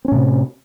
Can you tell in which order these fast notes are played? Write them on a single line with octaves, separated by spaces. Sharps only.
C4 C#4 A2 C3